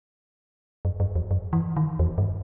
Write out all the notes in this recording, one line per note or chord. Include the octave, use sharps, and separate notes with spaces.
F#2
F#2
E2
F#2
E3
D#3
E2
G2